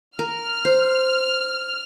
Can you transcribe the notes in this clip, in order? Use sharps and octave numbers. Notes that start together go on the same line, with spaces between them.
A#4 F6
C5